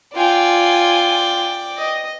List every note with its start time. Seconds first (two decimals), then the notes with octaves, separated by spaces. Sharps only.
0.15 F4 D5 G5 G#5
1.77 D#5